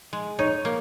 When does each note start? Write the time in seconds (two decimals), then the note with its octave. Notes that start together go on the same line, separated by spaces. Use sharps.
0.13 G#3
0.39 D#4 C#5
0.65 A#3